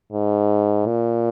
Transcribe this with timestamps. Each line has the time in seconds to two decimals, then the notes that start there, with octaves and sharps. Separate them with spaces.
0.13 G#2
0.86 A#2